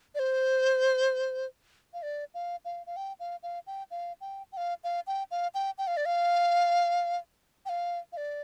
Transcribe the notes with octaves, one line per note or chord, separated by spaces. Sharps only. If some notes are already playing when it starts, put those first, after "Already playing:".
D5
C5
F5
D5
F5
F5
F5
G5
F5
F5
G5
F5
G5
G5
F5
F5
G5
F5
G5
G5
F5
D5
F5
G5
F5
F5
D5